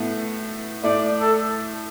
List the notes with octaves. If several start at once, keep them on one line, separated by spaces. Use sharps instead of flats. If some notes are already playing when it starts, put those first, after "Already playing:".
Already playing: A2 A3 B3
A2 A3 D5
A4